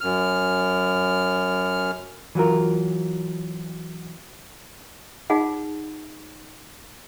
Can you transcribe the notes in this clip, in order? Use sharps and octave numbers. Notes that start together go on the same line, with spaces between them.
F#2 F6
E3 F#3 F4 A#4
D#4 F4 G#4 F#5